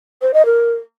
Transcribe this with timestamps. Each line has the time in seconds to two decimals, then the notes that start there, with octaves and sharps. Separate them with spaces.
0.22 C5
0.34 D#5
0.46 A#4